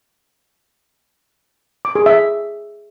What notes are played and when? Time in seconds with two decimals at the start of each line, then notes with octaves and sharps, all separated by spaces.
1.85 D6
1.95 G#4
2.06 E5